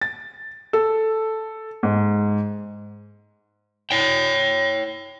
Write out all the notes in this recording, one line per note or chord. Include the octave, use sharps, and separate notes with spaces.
A6
A4
G#2
C#5 G5